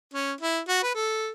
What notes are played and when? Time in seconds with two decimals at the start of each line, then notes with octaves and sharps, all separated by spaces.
0.13 C#4
0.41 E4
0.68 F#4
0.83 B4
0.94 A4